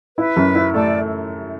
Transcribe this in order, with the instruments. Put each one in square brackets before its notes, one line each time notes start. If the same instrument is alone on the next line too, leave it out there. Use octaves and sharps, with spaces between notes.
[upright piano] E4 [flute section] B4
[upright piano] F#2
E4
[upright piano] A3 [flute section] A4 D5